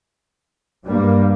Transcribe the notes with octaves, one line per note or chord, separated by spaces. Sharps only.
G2 G3 A#3